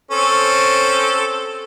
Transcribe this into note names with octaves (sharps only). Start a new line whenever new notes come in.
C4 C#4 A4